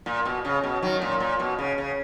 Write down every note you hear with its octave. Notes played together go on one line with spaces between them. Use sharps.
A#2
B2
C#3
B2
D#3 F#3
A#2
A#2
B2
C#3
C#3